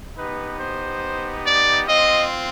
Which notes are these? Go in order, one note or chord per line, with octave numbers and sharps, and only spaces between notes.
B3 D#4 G4 B4
C5
D5
C4 F4 D#5